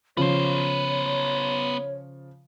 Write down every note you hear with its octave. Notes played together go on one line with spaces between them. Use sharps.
C#3 F3 B3 C5 C#5